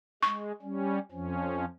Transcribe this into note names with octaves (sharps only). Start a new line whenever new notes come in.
G#3 C#6
G3 C#4
F2 F3 C#4